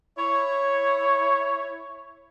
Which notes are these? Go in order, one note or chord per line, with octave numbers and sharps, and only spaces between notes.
E4 C#5